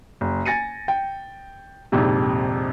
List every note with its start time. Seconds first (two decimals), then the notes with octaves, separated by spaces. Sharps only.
0.21 F#1
0.45 G#5 A6 A#6 C#7 D#7
0.88 G5
1.92 A#1 F2 G#2 C3